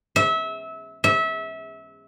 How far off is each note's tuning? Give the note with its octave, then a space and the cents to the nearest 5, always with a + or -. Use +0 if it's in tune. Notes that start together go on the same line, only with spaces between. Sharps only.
E5 -25
E5 -25